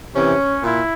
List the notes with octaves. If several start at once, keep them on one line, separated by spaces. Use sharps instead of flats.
C3 E3 C#4
A#2 E4